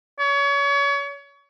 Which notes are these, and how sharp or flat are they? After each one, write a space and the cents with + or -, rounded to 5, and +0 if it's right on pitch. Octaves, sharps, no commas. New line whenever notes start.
C#5 +30